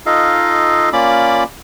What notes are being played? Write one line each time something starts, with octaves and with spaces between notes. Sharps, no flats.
D#4 F4 A4 D#5 F5
A#3 C#4 F4 D5 B5 D6